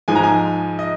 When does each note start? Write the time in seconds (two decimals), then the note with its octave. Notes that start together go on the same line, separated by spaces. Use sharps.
0.08 G#2 F3 G#3 G#5
0.16 A#5
0.23 G#5
0.79 D#5